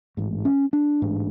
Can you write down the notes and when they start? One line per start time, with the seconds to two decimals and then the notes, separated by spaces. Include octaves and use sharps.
0.17 A1 G#2
0.45 C#4
0.73 D4
1.02 A1 G#2